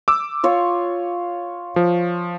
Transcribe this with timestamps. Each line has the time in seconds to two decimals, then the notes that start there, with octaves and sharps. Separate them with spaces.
0.08 D6 E6
0.44 F4 C#5
1.76 F3